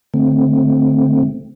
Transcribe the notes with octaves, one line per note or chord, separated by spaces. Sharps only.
D3 A3 C4